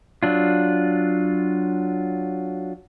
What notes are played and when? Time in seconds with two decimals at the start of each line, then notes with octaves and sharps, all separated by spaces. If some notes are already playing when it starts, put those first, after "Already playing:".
0.23 F#3 D4 F4